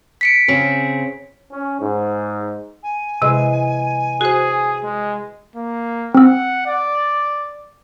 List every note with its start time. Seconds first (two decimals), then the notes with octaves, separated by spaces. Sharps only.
0.21 B6 C#7 D7
0.48 C#3 C4 G#4
1.52 C#4
1.80 G#2
2.82 G#5
3.22 C3 E3 G#3 E6
4.21 F#4 G#4 C5
4.84 G#3
5.56 A#3
6.15 C4 F#5 E6
6.67 D5